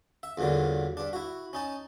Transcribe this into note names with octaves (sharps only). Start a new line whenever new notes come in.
E5
E2 G2 A#2 D3 F#3
G2 D4
E4 F#4
C#4 D#4 A5